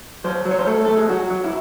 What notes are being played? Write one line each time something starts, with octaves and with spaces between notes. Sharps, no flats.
F#3 C5
F#3
C#5
C5
A3 A4
A3 A4
G#4
F#3 F#4
F#3
E4